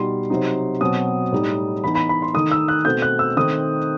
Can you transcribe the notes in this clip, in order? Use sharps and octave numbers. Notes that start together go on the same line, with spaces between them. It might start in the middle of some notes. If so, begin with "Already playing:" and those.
Already playing: B2 G3 D#4 C6
C3 F#3 C4 D#4
B2 F#3 C4 D#6
A2 G3 D#4
E3 B3 D#4 B5
B5
B5
C6
D#3 A3 D#4 D#6
E6
F#6
B2 A3 C4 G6
F#6
E6
D#3 A3 C4 D#4 D#6